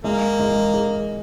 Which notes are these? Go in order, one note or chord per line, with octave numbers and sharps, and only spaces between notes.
G#3 A#3
G#3
G#4